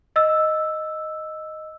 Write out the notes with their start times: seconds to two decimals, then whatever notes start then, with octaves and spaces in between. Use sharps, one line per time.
0.16 D#5 E6